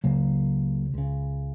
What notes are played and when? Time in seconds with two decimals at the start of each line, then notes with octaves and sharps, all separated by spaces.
0.04 C#2 C#3 F#3 A#3
0.94 C#2 C#3